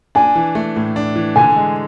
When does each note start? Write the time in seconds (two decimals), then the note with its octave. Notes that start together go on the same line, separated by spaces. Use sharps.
0.15 D4 G#5
0.35 E3
0.55 A3
0.76 A2
0.96 D4
1.16 E3
1.36 D3 G#5
1.56 G#3